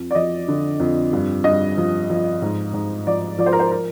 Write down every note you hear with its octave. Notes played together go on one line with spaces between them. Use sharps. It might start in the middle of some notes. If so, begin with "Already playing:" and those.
Already playing: F2
D5
F3 D#5
D3
F2
G2
G2 D#5
F3
F3
G#2
G#2
F3 D5
F3 D5
C5
A#4
C5
A#4